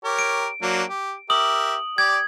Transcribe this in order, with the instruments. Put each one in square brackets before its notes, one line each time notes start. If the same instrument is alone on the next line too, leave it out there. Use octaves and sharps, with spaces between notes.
[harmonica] G4 A#4 C#5
[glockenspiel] D7
[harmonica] F#3 A#3 D4
G4
[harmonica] G4 A#4 E5 [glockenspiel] D#6 F#7
[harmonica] G4 D5 [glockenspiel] G#6